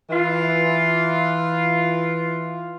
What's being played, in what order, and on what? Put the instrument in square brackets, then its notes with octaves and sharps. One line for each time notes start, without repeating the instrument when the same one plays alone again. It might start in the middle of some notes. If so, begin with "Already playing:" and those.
[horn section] E3 F4